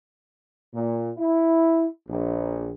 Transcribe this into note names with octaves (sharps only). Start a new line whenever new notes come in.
A#2
E4
A#1